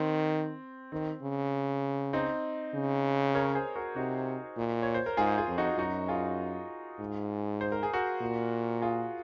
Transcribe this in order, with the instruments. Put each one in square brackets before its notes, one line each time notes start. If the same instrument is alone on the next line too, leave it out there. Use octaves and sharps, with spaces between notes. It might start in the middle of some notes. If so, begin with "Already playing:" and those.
Already playing: [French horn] D#3 [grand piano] C4
[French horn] D#3 [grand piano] C4
[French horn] C#3
[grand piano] C4 D#4
[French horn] C#3
[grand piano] A#4 C#5
G#4 C5
F#4 A#4
[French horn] C3 [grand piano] D#4 F#4
[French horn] A#2
[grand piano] C#5
C5
A#4
[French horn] G#2 [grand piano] F4 G#4
[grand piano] F4 G#4
[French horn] F2
[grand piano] D#4 F#4
[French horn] F#2 [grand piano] D#4 F#4
[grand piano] F4 G#4
[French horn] G#2
[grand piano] C5
A#4
G#4
F#4 A#4
[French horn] A#2
[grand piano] F4 G#4